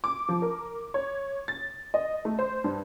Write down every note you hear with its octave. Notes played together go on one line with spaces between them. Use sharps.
D6
F3
A#4
C#5
A6
D#5
A3
C5
G2